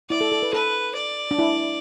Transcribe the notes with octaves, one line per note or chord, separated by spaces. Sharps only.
E4 D5
A4
A4
B4
A4 B4
D5
D4
E4